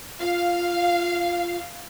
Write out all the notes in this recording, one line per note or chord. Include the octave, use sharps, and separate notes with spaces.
F4 F5